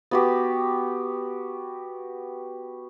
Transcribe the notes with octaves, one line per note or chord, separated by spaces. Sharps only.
B3 F#4 G4